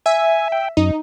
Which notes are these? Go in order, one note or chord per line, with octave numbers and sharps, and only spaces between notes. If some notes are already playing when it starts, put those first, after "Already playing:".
E5 G#5
G5
F#2 D#4